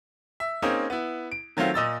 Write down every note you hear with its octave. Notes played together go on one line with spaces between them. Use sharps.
E5
A#3 C4 C#4 D#4 G#4
B3 E4
D7
D#3 F#3 A3 C4 F4
A#2 D#5 E6 A6